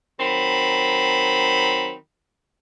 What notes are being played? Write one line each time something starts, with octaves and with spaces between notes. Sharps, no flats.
D#3 F#3 C4 B5